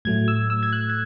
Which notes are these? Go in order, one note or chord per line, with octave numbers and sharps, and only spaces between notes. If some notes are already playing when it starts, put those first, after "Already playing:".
A2 F#3 A3 G#6
E6
E6
G#6
F#6
G#6